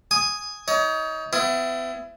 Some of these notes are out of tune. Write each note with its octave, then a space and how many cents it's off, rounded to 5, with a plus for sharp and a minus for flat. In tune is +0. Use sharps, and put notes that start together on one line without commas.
G#5 +0 D#6 +0
D#4 +25 C#5 +35
B3 +45 E4 +25